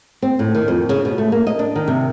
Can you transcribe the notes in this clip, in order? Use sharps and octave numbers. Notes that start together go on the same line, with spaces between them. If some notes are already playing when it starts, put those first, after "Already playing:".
C4
A2
D#3
F2
C#3
B2
A3
A#3
D#5
D4
D#3
C3